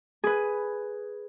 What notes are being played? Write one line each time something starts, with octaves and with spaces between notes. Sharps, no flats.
G#4 B4